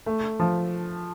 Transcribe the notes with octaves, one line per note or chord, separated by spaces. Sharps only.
A3
F3